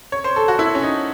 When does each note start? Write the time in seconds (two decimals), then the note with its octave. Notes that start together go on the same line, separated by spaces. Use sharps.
0.12 C#5
0.24 C5
0.36 A4
0.48 F#4
0.59 E4
0.75 C#4
0.83 D#4